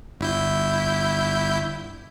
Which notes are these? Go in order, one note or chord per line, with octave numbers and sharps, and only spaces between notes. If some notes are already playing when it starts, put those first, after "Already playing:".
G1 E4 G6